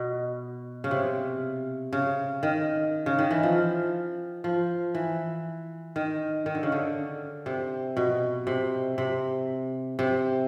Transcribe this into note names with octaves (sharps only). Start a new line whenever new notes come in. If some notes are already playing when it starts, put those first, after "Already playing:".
Already playing: B2
C#3
C3
C#3
D#3
C#3
D#3
E3
F3
F3
E3
D#3
D#3
D3
C#3
D3
C3
B2
C3
C3
C3